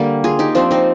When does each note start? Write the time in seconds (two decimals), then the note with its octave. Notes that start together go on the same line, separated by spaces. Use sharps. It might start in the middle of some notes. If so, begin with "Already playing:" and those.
Already playing: D3 G3 A#3
0.24 F4 G#4
0.39 D#4 G4
0.55 F3 C4 D4
0.71 C4 D#4